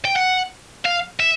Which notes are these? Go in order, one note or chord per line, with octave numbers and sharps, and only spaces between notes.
G5
F#5
F5
E5